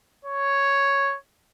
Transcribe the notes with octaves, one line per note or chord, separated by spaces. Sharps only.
C#5